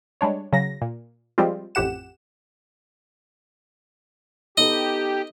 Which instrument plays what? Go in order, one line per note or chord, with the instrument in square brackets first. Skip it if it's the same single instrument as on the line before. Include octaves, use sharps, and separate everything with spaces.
[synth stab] G3 G#3 D4 C#5
C#3 F#3 A#6
A#2
F3 G3 G#3 C4 F4
A1 F2 G4 F#5 E7
[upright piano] B3 D#4 A4 [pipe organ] G4 [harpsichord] D#5